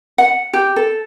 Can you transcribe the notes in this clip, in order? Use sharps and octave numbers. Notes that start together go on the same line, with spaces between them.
F#5
G4
A4